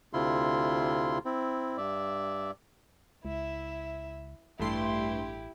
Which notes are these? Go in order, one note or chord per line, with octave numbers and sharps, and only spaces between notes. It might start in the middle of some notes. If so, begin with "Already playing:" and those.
D2 C3 E4 F4 C6
C4 E4
G2 D5 E5
C#2 E4 E5
A1 G2 A3 E4 G4 C6